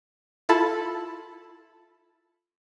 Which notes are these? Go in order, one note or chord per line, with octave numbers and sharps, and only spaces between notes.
E4 F4 A4 A5 B5